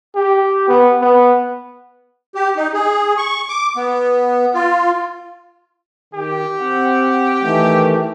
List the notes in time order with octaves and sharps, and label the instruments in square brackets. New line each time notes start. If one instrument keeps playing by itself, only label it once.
[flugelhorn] G4
B3
B3
[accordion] G4
D#4
G#4
C#6
D6
B3
F4
[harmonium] D#3 [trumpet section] G4
[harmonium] C4 F#5
D#3 E3 A3